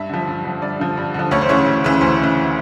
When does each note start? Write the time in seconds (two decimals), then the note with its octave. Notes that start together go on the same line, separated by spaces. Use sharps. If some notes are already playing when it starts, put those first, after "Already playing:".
Already playing: G2 E5
0.09 D3 F3
0.28 G2
0.45 D3 F3
0.62 G2 D5
0.80 D3 F3
0.97 G2
1.14 D3 F3
1.31 D2 C#5
1.41 C5
1.49 C#3 E3 C#5
1.66 D2
1.84 C#3 E3
2.01 D2 C5
2.19 C#3 E3